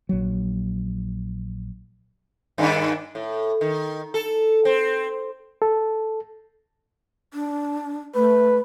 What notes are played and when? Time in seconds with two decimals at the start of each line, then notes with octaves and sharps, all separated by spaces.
0.09 A#1 F#3
2.58 G2 D#3 D4
3.15 A2
3.61 D#3
4.14 A4
4.65 C4
5.62 A4
7.34 D4
8.15 A3 B4